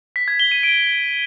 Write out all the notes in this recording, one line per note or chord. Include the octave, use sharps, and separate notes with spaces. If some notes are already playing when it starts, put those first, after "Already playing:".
B6
G#6
G7
D#7
D7